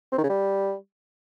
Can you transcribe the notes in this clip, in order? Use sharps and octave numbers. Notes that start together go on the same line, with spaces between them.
C4
D#3
C#3
G3